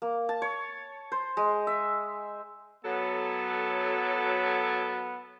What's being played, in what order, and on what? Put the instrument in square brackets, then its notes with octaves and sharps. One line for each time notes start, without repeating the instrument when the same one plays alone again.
[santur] A#3
A5
C#5
C5
G#3
E5
[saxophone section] F#3 A4 [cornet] B3